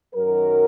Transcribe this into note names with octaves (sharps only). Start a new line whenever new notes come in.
F#2 D#3 F#3 A#4